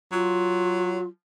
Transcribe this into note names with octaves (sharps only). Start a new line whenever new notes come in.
F#3 F4